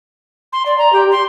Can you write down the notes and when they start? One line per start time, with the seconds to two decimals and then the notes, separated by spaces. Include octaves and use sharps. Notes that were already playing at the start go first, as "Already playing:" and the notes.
0.53 C6
0.66 D5
0.78 A#5
0.93 G4
1.12 C6